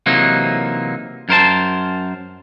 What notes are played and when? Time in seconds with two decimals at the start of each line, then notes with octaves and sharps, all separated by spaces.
0.06 C3 E3 F#3 A#3 D#4
1.29 F#2 A#4 C5 A5